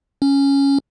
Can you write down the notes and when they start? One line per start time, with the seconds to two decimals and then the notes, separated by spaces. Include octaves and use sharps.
0.22 C#4